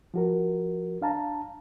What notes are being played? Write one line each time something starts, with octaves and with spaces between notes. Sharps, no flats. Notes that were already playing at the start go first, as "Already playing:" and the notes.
F3 F#4 A#4
D4 F5 A5 A#5